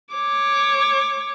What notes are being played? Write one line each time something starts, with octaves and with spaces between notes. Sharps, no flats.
C#5 D6